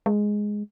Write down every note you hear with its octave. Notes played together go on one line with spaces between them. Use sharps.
G#3